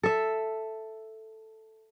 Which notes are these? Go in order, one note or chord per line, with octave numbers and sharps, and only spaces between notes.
A4 E5